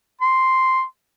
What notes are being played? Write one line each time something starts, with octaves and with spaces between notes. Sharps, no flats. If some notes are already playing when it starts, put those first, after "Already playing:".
C6